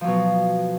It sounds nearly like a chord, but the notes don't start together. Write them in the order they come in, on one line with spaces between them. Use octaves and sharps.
F3 F#3 B2